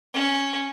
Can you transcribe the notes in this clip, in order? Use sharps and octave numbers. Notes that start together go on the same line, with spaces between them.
C#4